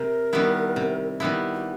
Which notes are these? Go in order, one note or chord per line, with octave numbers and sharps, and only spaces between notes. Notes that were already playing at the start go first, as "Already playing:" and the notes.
Already playing: C3 A#4
D#3 G3 B3 E4
C3
D#3 G3 B3 E4
G4